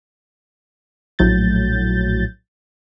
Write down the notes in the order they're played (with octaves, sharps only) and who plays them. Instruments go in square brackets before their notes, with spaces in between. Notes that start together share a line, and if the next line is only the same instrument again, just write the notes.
[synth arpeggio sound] A#1 A2 F#3 G6 A6